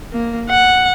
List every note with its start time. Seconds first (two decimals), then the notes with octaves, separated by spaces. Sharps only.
0.13 A#3
0.50 F#5